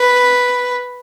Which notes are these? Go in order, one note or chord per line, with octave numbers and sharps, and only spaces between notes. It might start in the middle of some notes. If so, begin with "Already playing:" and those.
Already playing: B4